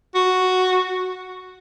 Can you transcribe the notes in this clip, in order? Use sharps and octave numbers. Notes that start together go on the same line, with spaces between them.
F#4